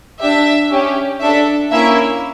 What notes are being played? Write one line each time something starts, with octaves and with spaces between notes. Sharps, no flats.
D4 G4 E5
C#4 G4
D4 A4 E5
A#3 C#4 E4 E5